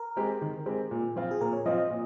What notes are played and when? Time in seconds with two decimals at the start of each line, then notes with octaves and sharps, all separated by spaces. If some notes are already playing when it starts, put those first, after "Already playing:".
Already playing: A#4
0.16 G#3 C4 G4
0.41 D#3
0.66 G#3 C4 G4
0.91 A#2
1.16 F3 C4 F4
1.31 G#4
1.41 A#2 A#4
1.53 C#5
1.65 F3 C4 F4 D#5
1.78 D#5
1.90 A#2